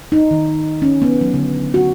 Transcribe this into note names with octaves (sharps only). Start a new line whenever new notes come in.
D#4
D#3
C#4
B3
F#3
D3
F#4